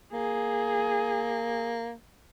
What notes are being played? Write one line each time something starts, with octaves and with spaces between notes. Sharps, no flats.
A#3 G#4